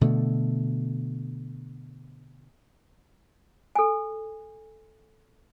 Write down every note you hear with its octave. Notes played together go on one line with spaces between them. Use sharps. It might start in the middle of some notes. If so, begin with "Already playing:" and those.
B2 D3 A3
A4 G#5